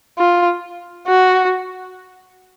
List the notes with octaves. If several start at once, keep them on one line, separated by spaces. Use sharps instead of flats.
F4
F#4